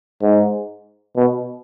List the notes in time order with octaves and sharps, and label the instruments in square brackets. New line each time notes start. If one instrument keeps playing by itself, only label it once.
[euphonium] G#2
B2